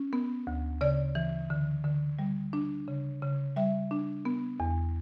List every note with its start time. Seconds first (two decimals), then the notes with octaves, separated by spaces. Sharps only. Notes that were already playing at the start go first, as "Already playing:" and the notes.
Already playing: C#4
0.13 B3
0.47 D2
0.81 C#3 D5
1.15 E3
1.50 D3
1.84 D3
2.19 G3
2.53 D4
2.88 C#3
3.22 C#3
3.56 G3 E5
3.91 D4
4.25 B3
4.60 E2